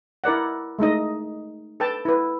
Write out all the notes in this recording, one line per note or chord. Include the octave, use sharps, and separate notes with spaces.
E4 A#4 D5 F#5
G#3 A3 D#4 D#5
A4 B4 G5 A5
E4 B4